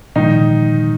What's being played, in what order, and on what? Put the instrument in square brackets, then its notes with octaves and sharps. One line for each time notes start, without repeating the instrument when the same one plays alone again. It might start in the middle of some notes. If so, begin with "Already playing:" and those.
[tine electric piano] A#2 F3 G#3 [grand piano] D#3 D#4